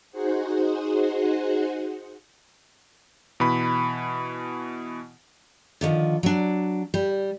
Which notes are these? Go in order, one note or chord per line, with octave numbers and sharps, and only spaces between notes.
D#4 F#4 G#4 C5 F#5
B2 E3 B5
D3 D#3 F3
F#3 D4
G3